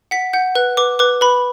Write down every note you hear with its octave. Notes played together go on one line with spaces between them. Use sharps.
F#5 B6
F#5 G6
B4 F#6
B4 D6
B4 D6
B4 B5